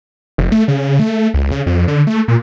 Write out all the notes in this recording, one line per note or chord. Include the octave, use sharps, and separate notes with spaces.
F1
A3
C#3
A3
C#2
C#3
F2
D3
A3
A#2